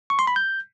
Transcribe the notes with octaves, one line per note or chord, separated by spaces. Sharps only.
C#6
C6
B5
G6